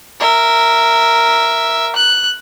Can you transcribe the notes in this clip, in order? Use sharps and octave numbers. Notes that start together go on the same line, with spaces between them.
A#4 E5
F#6